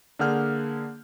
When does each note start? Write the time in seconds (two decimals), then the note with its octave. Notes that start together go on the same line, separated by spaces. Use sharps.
0.19 D3 A#3 G#4 F#5 F6 G6